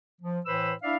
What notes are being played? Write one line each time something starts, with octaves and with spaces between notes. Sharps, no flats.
F3
A2 E3 B4 C5 B5 E6
D4 E4 D5 E5 F5